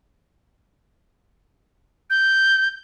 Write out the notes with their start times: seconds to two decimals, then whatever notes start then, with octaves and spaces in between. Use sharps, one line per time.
2.10 G6